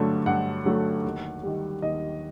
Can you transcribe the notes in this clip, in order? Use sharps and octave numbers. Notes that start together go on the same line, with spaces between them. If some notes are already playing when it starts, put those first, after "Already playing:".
Already playing: G2 D3 F#3 A3
G2 F#5
D3 F#3 A3
D#2
D#3 G3
D#2 D#5